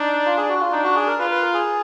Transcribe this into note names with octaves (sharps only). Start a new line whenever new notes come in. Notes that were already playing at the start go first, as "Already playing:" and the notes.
Already playing: D4 D#4
F4
G#4
F#4
F4
D4 D#4
F#4
G#4
A#4
F4 B4
B4
A#4
G#4